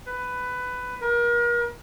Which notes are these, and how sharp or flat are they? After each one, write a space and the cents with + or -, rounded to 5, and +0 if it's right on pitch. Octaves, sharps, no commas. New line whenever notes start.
B4 +15
A#4 +35